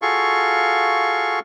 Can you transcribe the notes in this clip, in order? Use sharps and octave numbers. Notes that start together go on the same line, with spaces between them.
F4 F#4 G#4 A4 F5 C#6